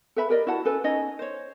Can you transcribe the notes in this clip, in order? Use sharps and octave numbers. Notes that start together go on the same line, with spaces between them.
A4 B4 E5 B5
G4 A#4 D5 D#5
E4 F#4 F#5 A5
C#4 A4 B4
C#4 D#4 C#5 D#5
C5 C#5